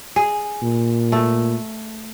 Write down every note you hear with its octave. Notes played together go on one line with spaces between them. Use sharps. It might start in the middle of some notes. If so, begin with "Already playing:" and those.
G#4
A#2
A3